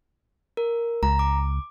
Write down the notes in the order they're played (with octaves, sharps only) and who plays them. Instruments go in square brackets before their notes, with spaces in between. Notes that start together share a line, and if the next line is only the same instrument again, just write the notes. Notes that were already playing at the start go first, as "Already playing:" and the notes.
[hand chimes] A#4
[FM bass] C#2 [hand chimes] A#5
[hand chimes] D6